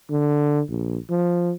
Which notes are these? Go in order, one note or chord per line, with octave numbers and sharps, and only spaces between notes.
D3
A#1
F3